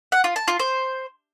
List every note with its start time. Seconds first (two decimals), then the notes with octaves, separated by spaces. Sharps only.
0.12 F#5
0.24 F4
0.36 A5
0.48 F4
0.60 C5